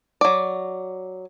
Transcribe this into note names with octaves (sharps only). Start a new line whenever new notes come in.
F#3 D5